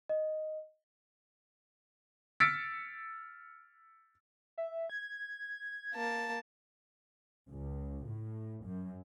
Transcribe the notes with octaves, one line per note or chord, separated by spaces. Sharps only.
D#5
E6 F6 A6 B6 C#7 D7
E5
G#6
A#3 A5
C#2
A2
F#2